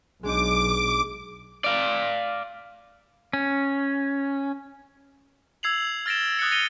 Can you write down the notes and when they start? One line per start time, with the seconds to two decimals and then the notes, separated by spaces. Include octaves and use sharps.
0.23 B1 G#3 D4 D#4 D6
1.64 D5 F5
3.33 C#4
5.63 E6 G#6 C7 F7 F#7
6.06 F6 A6 A#6 D7 E7
6.39 D#6 F#6 A6 C#7
6.51 A#6 C#7 D#7 G7